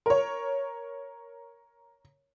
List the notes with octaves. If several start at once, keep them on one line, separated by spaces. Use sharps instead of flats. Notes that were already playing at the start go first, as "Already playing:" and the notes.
A#4 C#5